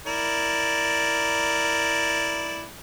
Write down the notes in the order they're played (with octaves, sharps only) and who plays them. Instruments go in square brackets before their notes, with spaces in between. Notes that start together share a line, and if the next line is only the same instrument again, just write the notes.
[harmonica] E4 A#4 D5